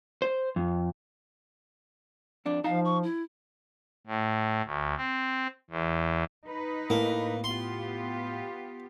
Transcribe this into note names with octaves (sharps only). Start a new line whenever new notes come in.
C5
F2
F2 D4
F3 D#4 F5 A5 A#5
C#6
E4
A2
D2
C4
E2
D#4 B4 D#5
A2 A#3
B3 F4 G4 C6